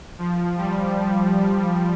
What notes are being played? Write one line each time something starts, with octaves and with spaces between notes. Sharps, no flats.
F3
G3